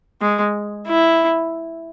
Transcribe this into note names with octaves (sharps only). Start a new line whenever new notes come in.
G#3
E4